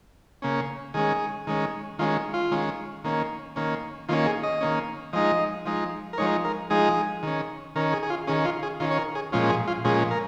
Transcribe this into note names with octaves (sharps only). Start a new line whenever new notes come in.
C#3 A#3 C#4
D#3 G#3 C#4 G#4
D#3 G#3 C#4
D#3 G#3 C#4 F4
F4
D#3 G#3 C#4
D#3 A#3 C#4
D#3 A#3 C#4
D#3 A#3 C#4 F4
G#4
D#5
D#3 A#3 C#4
F3 G#3 D#4 D#5
F3 G#3 D#4
A#4
F3 G#3 D#4 C#5
A#4
F3 G#3 D#4 G#4
D#3 C#4
D#3 C#4 A#4
G#4
G#4
F4
D#3 C#4 G#4
F4
G#4
D#3 C#4 F4
C#5
A#4
G#4
A#2 F3 G#3 C#4 F4
G#4
F4
A#2 F3 G#3 C#4 G#4
A#4